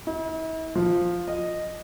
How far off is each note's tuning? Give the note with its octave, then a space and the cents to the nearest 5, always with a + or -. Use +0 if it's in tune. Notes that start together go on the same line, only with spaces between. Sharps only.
E4 -45
F3 +5
D#5 -10